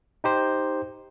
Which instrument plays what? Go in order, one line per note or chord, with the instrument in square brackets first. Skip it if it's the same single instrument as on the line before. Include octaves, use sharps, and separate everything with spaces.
[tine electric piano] D#4 G4 C5